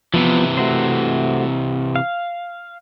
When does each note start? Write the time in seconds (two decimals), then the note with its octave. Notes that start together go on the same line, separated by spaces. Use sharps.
0.14 C3 E3 F3 B3
0.57 A3 F#4 C5
1.96 F5